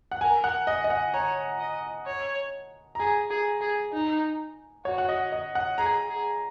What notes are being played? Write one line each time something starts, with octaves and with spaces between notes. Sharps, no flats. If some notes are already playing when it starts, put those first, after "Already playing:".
F#5
A#4 G#5
F#5
D#5
D#5
F#5
C#5 A#5
D#5
C#5
A#5
G#4 G#5
G#4
G#4
D#4
F#4 C#5
F#5
D#5
D#5
F#5
G#4 A#5
G#4